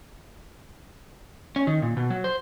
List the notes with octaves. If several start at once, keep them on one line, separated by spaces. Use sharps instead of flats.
C#4
D#3
A#2
B2
F#3
C5